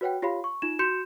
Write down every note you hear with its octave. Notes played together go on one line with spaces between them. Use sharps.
F#4 B4 C#5 F#5 G5
F4 G4 C#5 F5 B5
C#6
D#4 F4 E7
F#4 C6 G6 C#7 E7